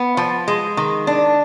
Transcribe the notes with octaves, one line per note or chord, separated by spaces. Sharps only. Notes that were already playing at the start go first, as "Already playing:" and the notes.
Already playing: B3
F3
G#3
D#3
D4